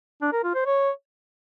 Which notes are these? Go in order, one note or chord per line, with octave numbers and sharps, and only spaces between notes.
D4
A#4
F4
C5
C#5